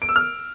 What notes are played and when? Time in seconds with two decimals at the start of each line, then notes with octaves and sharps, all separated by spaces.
0.02 D7
0.09 E6
0.16 F6